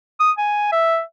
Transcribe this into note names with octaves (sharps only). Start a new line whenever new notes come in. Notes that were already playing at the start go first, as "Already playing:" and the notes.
D#6
G#5
E5